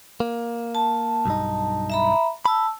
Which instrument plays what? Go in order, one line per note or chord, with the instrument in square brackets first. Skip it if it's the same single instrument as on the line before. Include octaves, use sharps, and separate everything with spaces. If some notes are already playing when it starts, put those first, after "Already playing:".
[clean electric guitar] A#3
[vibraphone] A5
[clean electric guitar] B1 G2 D#4
[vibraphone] E5 A#5 B5
[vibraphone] A5 E6 [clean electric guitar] B5